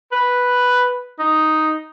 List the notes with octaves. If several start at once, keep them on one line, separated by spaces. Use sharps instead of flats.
B4
D#4